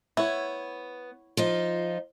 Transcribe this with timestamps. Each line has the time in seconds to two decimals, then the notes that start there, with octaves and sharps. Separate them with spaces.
0.17 B3 E4 C#5
1.37 F3 D#4 F4